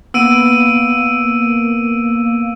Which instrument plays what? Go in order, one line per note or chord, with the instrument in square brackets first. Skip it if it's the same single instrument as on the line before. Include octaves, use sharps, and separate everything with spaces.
[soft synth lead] A#3 [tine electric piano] B3 [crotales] E6 D7 D#7